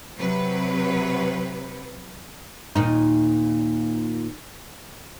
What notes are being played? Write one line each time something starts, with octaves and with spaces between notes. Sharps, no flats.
C3 F#3 B4
D#2 A#2 D#4